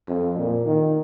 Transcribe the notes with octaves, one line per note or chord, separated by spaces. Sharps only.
F2
A#2
D#3